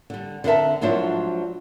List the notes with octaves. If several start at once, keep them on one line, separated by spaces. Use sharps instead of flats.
D3 G3
D3 C4 A#4 E5 A5
G#2 F3 F#3 D4 E4 C5